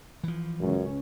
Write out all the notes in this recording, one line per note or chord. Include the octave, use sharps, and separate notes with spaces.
E3 F3
C#2 F#2 C#4